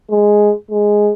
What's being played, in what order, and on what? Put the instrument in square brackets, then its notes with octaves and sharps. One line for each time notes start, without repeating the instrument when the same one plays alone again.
[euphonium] G#3
G#3